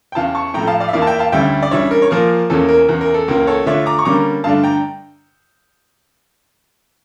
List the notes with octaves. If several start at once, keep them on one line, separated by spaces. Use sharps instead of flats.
G5
E2 C#3 E3 F5 A5
A5 C#6
A2 F3 A3 G5 A#5
F5 A5
D5 F5
E5
E2 E3 A#3 E4 D5 F5
A5
E5 G5
F5 A5
D2 D3 G3 C#4 E4 E5 G5
D5
C#3 E3 G3 D4 C#5 E5
A#4
C#5
A#2 F3 A#3 A#4
E2 C#3 E3 A#3 C#4 A4
A#4
E2 C#3 E3
A#4
A4
C#2 C#3 E3 A#3 A#4
A4 C#5
D3 A3 D4 F4 C#5 E5
A#5 D6
C#6
D3 G3 A#3 C#4 A#5 D6
G2 D3 A3 D4 F5 A5
G5 A#5